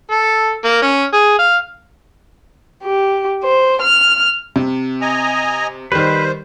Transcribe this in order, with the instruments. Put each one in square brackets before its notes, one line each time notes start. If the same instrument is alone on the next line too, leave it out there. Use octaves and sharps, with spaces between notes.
[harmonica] A4
A#3
C#4
G#4
F5
[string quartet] G4
C5
F6
[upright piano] C3
[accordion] D#5 G#5 A#5
[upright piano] D#3 G3 [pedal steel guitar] B4 [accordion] C5